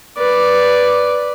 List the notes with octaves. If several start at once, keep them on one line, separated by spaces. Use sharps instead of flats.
B4 D5